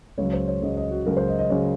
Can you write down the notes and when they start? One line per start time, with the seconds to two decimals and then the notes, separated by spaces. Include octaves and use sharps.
0.18 C#2 C#3 F#3 C#5
0.33 C5
0.48 C#5
0.62 C#2 C#3 F#3 D#5
0.77 D#5
0.91 F#4
1.05 C#2 C#3 F#3 A#4
1.17 C5
1.28 D#5
1.39 D#5
1.49 C#3 F#3 C#5